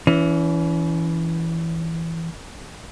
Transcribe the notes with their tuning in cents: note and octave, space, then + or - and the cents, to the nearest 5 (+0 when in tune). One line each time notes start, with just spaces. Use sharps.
E3 +0 C#4 +35